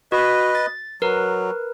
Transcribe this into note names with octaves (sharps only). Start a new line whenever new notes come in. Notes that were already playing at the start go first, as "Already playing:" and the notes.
F#4 B4 D#5
A6
F#3 A#4 B4